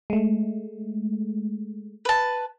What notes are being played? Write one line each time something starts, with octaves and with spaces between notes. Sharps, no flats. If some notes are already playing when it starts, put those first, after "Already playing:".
G#3 A3
B4 A5